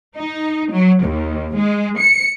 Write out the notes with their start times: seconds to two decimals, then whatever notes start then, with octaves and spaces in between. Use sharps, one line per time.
0.17 D#4
0.72 F#3
1.03 D#2
1.56 G#3
2.00 C#7